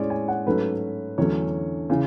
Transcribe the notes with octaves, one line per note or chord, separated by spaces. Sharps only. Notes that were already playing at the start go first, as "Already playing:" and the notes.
Already playing: A2 G#3 C#4 C#5 D5
G#5
F#5
G#2 F#3 A3 C#4 B4
E2 D3 F#3 A3 C#4 C#5
C#3 E3